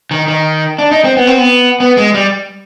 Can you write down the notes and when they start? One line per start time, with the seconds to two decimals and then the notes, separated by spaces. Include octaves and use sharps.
0.11 D#3
0.28 D#3
0.78 D4
0.91 D#4
1.04 C4
1.17 B3
1.27 C4
1.38 B3
1.80 B3
1.97 G#3
2.14 G3